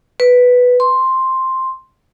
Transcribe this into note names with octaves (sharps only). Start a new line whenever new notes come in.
B4
C6